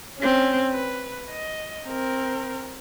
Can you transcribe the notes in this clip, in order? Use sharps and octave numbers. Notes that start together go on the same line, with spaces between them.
C4 C#4
B4
D#5
C4 A#4